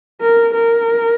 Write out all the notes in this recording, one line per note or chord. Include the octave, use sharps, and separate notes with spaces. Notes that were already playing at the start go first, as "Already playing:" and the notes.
A#4
A#4